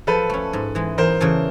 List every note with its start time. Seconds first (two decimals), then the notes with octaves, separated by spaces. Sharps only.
0.07 F3 A4 B4
0.30 A3 C#4
0.53 G#2
0.75 E3 G#3
0.98 E2 A#4 C5
1.20 C#3 E3 A3